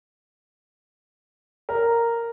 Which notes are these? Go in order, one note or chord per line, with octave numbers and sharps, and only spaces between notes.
A#4